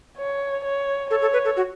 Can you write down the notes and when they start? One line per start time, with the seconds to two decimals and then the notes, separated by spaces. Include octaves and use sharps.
0.18 C#5
0.65 C#5
1.11 A4 C#5
1.22 A4
1.33 B4
1.45 A4
1.56 F#4